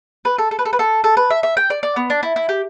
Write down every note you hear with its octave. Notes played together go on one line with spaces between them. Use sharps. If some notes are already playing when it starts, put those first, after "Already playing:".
B4
A4
A4
B4
A4
B4
A4
A4
B4
E5
E5
G5
D5
D5
B3
D4
E4
E4
G4